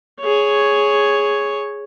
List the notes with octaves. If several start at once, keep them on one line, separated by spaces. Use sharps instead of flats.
G#4 C#5